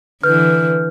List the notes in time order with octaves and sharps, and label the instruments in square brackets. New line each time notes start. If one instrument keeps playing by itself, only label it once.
[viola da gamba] D3 E3 [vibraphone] B4 [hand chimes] F6 G6